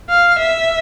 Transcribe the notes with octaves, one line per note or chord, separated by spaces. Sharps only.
F5
E5